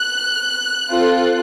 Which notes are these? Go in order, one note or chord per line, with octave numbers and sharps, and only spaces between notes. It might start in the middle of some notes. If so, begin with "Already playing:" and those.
Already playing: F#6
C4 F4 A4